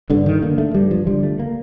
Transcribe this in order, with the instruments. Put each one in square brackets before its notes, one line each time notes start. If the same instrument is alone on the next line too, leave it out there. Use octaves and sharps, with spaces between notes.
[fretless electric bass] G2 D3
D#3
D3 A#3
A3
G2 G3
F3
D3 G3
A3
A#3